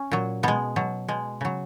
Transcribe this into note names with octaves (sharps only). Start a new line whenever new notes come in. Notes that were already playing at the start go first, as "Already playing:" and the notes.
Already playing: C#4
A#2 F#3
B2 G#3 B3
B2 F#3
B2 G#3
C#3 F#3